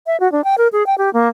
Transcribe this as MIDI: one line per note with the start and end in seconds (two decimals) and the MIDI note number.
0.07 0.19 76
0.20 0.30 66
0.32 0.44 62
0.44 0.55 79
0.58 0.68 70
0.72 0.85 68
0.86 0.95 79
0.98 1.12 67
1.13 1.28 58